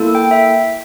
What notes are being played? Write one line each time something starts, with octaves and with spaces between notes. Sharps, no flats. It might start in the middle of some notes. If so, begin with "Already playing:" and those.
Already playing: A#3 E4 A4
G5
E5